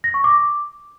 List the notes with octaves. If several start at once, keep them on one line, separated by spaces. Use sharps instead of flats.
A#6
C#6
D6